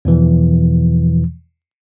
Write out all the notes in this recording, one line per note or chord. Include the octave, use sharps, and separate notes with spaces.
E2 B2 E3 F3